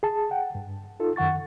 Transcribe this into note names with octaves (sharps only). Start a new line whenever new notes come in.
G#4 A5
F#5 G5
G2
D#4 F4 A4
F#2 D#3 F#5 C#6 A6